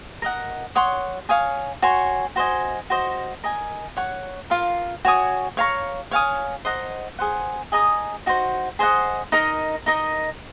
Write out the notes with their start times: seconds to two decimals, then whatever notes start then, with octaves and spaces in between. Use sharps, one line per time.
0.22 A#4 D#5 F#5
0.75 C#5 F#5 C6 D#6
1.29 C#5 F5 G#5 D#6
1.82 F#4 C#5 G#5 C6
2.36 F#4 C5 D#5 G#5
2.90 F#4 C5 D#5
3.44 A#4 D#5 G#5
3.97 C#5 F#5 C#6
4.50 F4 A#4 F5
5.05 F#4 C#5 G#5 D#6
5.57 C#5 F5 A#5 C#6
6.11 C#5 F5 G#5 D#6
6.65 C5 D#5 F#5 A#5
7.19 G#4 C5 F#5
7.72 G#4 D#5 A#5 D#6
8.26 D#4 F#4 C5
8.79 G#4 C5 D#5 F#5
9.32 D#4 A#4 D#5 A#5
9.86 D#4 A#4 D#5 A#5